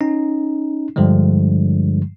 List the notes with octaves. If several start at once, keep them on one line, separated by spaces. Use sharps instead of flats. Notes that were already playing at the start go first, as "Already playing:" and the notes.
C#4 D#4
G2 D3 F3 G3 G#3